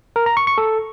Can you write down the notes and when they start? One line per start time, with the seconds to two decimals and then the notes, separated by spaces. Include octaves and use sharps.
0.16 A#4
0.26 A#5
0.37 C#6
0.47 C#6
0.58 A4